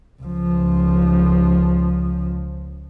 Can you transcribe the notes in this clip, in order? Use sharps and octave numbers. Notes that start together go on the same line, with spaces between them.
C#2 F3